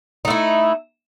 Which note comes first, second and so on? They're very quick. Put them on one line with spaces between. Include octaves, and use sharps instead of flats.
D#4 A3 E4